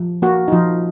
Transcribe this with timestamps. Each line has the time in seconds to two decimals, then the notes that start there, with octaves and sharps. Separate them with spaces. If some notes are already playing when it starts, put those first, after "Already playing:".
Already playing: F3
0.22 A#3 F#4
0.48 D#4
0.52 F3 F4